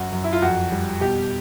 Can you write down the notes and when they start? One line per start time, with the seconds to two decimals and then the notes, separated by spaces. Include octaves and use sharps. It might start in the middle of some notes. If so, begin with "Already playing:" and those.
Already playing: F#2 F#4
0.12 F#2
0.24 E4
0.33 F4
0.42 F2 F#4
0.72 G3
1.01 B2 G4